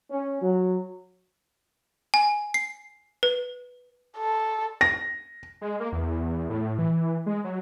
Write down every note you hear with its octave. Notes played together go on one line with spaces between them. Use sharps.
C#4
F#3
G#5
C7
B4
A4
A#6
G#3
A#3
E2
A2
E3
G#3
F#3